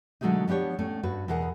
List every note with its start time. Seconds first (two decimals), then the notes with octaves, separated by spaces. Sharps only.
0.21 B2 D3 F#3 G#3 A3 D#4
0.48 F3 B3 D4 G4 C#5
0.79 A2 A3 C#4
1.03 G2 F#4 B4
1.28 E2 B2 G#4 A#4 F#5